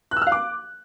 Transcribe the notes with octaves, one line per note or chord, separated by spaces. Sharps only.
F#6
E6
F6
F5
D6